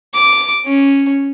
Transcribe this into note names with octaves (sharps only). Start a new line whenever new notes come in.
D6
C#4